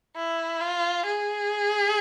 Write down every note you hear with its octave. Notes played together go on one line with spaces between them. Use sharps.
E4
F4
G#4